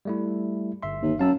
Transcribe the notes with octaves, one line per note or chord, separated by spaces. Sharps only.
G3 A3 E4
G1 E5 C6
D#2
F#2 F5 A5 E6